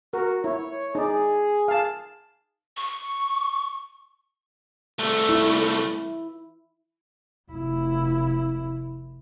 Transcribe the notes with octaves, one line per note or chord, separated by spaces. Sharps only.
F#4 A#4
E4 C#5
D#4 G#4 D5
F5 A5
C#6
C2 A3
E4
F1 E4